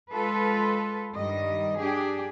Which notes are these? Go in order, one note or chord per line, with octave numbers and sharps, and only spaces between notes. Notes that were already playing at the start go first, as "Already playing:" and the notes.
G#3 F4 A4 B4
G2 D#3 G3 D#5
D4 G4 G#4